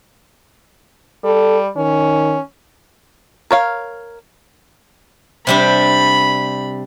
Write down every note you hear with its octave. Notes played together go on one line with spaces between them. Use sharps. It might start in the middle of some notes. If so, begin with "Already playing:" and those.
G3 A4
D#3 C#4
A#4 C#5 F5
C3 G3 D4 B5